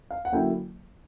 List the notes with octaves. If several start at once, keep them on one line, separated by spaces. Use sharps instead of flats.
F5
F#5
D3 F#3 A#3 C#4 E4 G5